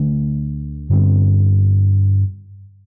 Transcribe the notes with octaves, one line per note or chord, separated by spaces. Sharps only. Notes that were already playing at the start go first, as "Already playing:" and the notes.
Already playing: D2 D3 A3
G2 D3 G3 C4